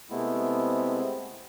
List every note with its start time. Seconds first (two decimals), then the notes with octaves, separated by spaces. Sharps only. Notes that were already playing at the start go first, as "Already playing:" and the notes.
0.11 C3 G#3 A3 B3 C4 E4